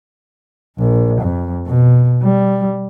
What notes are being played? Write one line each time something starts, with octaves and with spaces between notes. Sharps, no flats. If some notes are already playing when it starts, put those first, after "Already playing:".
A#1
F2
B2
G3